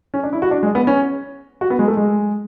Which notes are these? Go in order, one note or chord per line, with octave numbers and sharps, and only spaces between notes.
C#4
D4
E4
F#4
D4
G#3
B3
C#4
F#4
B3
G#3
A3
G#3